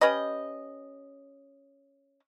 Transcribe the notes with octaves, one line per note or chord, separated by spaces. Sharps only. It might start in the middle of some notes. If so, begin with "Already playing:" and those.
C#4 G4 B4 D#5